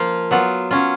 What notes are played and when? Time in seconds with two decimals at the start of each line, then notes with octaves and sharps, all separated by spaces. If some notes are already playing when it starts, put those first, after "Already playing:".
Already playing: F3 A#3 F4
0.31 F#3 B3 F4
0.71 F#3 C#4 F4